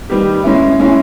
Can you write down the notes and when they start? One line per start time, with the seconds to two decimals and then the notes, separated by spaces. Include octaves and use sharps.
0.09 D#3 G3 B3 D#4 G4
0.44 G#3 C#4 E4
0.80 G#3 C#4 E4